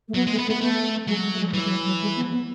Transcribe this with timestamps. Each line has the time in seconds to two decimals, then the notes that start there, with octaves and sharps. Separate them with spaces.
0.08 A3
0.15 F#3 B3
0.27 G#3
0.30 A3
0.38 B3
0.46 A3
0.50 B3
0.60 A3 B3
1.07 F#3 G#3
1.22 G#3
1.32 A3
1.39 G#3
1.53 E3 F#3
1.63 G#3
1.69 F#3
1.85 F#3
2.01 G#3
2.16 B3
2.31 B3